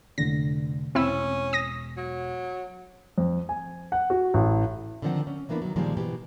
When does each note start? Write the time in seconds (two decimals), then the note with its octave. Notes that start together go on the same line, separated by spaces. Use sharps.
0.18 F1 D3 A#6
0.95 E1 C4 C#4 E4 E6
1.53 D#6 A#6
1.97 F#3
3.18 F2
3.49 G#5
3.92 F#5
4.10 F#4
4.34 A1
5.02 D3 D#3 F3 C4 F#5
5.27 C#4
5.49 E3 A#3 B3 D4 E4
5.62 D#3 F#3
5.76 A#2 D#3 F3 G3 G#3 A#3
5.97 G#2 B2 E3 G4